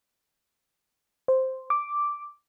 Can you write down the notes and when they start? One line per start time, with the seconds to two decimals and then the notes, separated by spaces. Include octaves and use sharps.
1.28 C5
1.70 D6